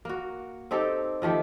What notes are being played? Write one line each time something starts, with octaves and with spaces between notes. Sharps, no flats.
A#3 F#4
C4 D#4 G4 A4
D#3 F3 A3 G4